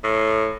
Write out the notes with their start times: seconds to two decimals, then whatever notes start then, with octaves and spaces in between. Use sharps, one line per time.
0.04 A2